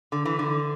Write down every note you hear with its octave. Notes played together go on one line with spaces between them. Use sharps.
D3
E3
D3